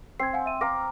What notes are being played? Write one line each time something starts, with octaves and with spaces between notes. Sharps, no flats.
C4 G#6 C7
F5 F#5 G#5
E5 D#7
F5 A#5 D6 A#6